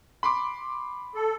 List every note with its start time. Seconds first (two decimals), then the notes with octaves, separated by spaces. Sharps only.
0.23 B5 C6 D6
1.15 A4